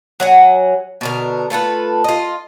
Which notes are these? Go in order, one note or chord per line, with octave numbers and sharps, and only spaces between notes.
F#3 F#5 G#5
B2 D3 A#4
A3 F4 A4 B4
F4 D#5